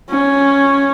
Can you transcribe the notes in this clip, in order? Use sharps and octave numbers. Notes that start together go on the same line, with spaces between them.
C#4